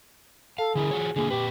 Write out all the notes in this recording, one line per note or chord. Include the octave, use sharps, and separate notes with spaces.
A4 F5
D3 E4 G#4 A#4
F4 F#4 C#5
D3 A#3 F4 G#4
A#2 G4 B4